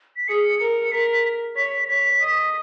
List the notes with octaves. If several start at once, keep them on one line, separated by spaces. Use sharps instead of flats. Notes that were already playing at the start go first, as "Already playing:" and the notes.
B6
G#4 C#7
A#4 C#7
A#4 B6
C#5 B6
C#5 B6
D#5